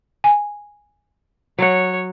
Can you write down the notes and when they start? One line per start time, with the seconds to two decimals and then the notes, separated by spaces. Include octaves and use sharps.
0.24 G#5
1.59 F#3 C#5 F#5